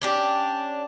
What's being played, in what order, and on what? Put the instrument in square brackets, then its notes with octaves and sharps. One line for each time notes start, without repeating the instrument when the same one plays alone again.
[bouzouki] C#4 D4 G4